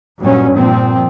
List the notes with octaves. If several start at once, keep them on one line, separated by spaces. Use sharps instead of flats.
G2 A#2 F#3 C#4
A#2 F3 C4